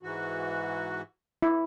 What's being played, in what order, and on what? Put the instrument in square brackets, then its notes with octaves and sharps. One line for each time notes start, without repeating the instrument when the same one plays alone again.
[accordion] G#2 E3 F#4
[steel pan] E4